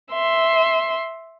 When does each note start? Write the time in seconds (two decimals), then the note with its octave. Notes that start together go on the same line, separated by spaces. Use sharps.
0.13 E5 C6